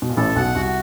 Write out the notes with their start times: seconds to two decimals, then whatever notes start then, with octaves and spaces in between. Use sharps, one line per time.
0.02 B2
0.09 A#2
0.16 A1 A2 A4
0.36 B1 B2 F#5
0.55 C2 C3 F#4